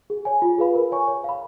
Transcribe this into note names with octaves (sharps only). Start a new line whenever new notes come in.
G#4
C#5 G#5
F4
G#4 B4 F5 B5
A#4
C#5 G#5 C#6
C#5
F5 B5